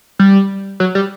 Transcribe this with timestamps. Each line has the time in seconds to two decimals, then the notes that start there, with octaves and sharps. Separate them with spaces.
0.19 G3
0.80 F#3
0.95 G3